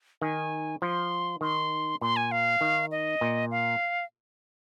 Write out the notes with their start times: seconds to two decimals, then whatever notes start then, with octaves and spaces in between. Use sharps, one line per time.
0.22 D#3 G#5
0.82 F3 C6
1.41 D#3 C6
2.01 A#2 C6
2.16 G#5
2.32 F5
2.61 D#3
2.91 D#5
3.21 A#2
3.51 F5